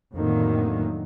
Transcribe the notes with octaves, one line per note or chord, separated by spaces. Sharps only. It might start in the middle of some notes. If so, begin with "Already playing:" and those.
F2 A2 D3 D#3 F#3 A#3